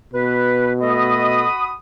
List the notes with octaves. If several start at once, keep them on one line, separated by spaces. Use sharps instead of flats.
B2 B4
A3 F#4 A4 D#5 B5 D#6